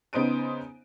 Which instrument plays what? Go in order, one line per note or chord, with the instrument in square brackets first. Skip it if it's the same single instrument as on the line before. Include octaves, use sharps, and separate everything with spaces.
[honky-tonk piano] C#3 B3 D#4 C5 D7 D#7